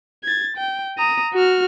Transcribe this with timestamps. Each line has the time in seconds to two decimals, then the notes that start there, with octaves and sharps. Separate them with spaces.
0.24 G#6 A6
0.56 G5
0.98 A#5 D#6
1.34 F#4 F6